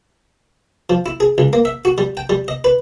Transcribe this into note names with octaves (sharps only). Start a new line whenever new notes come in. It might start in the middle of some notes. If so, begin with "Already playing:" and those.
F3
E4
G#4
C#2
A#3
E5
F#4
G3
G5
G3
D#5
B4